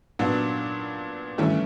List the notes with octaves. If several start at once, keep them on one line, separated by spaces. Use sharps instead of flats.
A#2 F#3 B3 D4
G2 E3 A3 C#4 E4